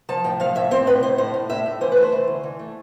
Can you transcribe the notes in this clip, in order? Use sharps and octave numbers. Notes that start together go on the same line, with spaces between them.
F3 A5
A2 G5
F3 F5
A2 E5
C4 C5
A2 B4
A2 C5
A2 C5
A2
A2 E5
A2
E3 C5
A3 B4
C5
E3
D2
E3
A3